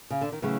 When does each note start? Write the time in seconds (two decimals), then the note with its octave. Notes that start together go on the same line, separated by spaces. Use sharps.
0.10 C#3
0.21 D3
0.32 D#3
0.42 C#3 E3 F#3 A3